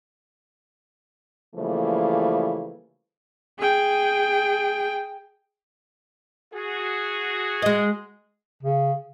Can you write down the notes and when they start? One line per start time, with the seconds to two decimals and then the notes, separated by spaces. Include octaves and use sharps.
1.55 C#3 E3 F3 G3 A3 A#3
3.58 G#4 G5
6.53 F#4 G#4
7.62 G#3 D#5
8.63 C#3